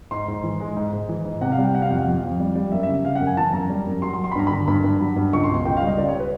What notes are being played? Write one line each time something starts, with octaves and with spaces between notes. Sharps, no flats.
G#2 C6
G#2
E3
G#3
G#2
G#2
E3
G#2
C3 F#5
F5
G3 G5
C3 F#5
F5
F2 F#5
F5
F2
F2
G3
G3
F#2 E5
E5
C#3
C#3 F5
F#5
F#2
G#5
E3 A5
F#2 A#5
G3
F#2
F#3 C6
C6
F#3
C6
B5
G2 A#5
D3 B5
G2 B5
G2
F#3
G2
C#2 C#6
C6
B2
C6
C#2 G5
F5
G3
D#5
C#2 D5
C#5
B4